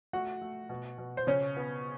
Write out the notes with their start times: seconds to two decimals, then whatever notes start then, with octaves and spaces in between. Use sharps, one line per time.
0.13 A3 F#4 F#5
0.41 A3
0.69 B2
0.98 B2
1.17 C5
1.27 C#3 C#4 C#5
1.57 B3